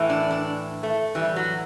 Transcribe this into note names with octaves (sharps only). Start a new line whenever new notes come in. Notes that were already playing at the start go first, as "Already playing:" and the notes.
Already playing: A2 E3
D4
D4
A3
A2 E3 G3
F#3